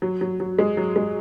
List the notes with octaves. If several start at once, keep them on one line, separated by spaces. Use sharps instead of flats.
F#3
F#3
F#3
G#3
F#3
G#3